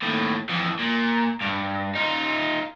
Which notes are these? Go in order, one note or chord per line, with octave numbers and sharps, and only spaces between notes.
D#2 A2
F2 E3
A#2
G2
D#4 F4